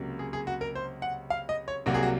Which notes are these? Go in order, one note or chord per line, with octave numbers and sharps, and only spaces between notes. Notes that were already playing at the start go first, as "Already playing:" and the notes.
Already playing: C#2 C3 F#3 A#3
G#4
G#4
F#4
A#4
C5
F#5
F5
D#5
C#5
C2 C3 F#3 A#3 F#4
G#4
F#4